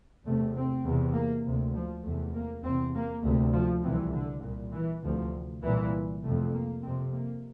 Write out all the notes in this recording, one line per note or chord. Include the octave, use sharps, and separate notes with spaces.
E2 C3 A3
C4
E2 C3
A#3
D2 C3
F3
E2 C3 A3
A#3
E2 C3 C4
A#3
D2 C3 A3
F3
C2 C3 E3
D3
C2 A#2
E3
D2 C3 F3
C2 A#2 E3
C3 A3
F2
A#3
F2 C3 C4
A#3